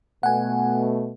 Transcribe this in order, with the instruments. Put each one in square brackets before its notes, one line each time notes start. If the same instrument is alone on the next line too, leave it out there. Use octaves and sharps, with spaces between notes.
[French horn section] B2 A3 [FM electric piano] F#5 G#5